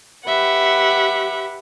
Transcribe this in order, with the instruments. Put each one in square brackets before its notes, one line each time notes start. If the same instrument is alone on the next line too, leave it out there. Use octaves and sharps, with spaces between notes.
[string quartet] G4 B4 E5 F#5